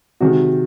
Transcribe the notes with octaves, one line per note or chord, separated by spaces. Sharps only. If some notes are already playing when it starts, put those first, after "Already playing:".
C3 D#3 G#3 F#4